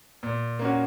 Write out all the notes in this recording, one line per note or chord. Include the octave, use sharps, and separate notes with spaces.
A#2
A#3 C#4 F#4